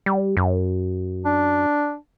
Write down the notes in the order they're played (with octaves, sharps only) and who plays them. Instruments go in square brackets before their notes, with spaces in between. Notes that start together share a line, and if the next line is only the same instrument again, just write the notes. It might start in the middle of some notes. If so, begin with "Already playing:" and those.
[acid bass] G3
F#2
[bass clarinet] D4